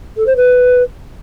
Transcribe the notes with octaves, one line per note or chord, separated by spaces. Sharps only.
A4
C5
B4